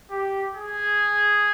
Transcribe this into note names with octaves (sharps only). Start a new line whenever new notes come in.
G4
G#4